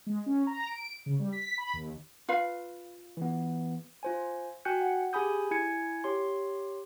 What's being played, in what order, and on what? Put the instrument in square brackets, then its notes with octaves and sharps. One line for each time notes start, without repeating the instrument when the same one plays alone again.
[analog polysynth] G#3
C#4
A#5
D7
C#3
G3
B6
B5
D#2
[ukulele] F4 B4 F5
[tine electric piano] E3 B3
[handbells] F4 C5 G#5
F#4 G5 G#5 F#6 G6 C#7
F#5
G4 G#4 G#5 B5 D#6 G6
E4 G#5 G#6 C#7
G4 C#5 C6